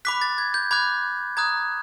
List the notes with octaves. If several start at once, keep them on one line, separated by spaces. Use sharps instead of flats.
B5 D6 F#6 B6
A6
G#6
G6
B5 D6 F#6 G#6
A#5 D#6 F#6 G#6